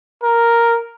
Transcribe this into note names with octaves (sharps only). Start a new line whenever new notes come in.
A#4